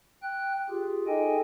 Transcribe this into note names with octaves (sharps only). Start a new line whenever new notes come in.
G5 F#6
F4 G4 G#4
D#4 G#4 A4 D#5 G5 G#5